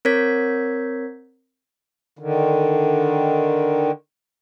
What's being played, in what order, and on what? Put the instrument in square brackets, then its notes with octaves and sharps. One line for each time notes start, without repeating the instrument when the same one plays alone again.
[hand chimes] C4 A#4 C#5 G#6 B6
[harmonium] D3 D#3